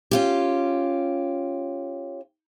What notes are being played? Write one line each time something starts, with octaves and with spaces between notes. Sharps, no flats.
C#4 F4 G4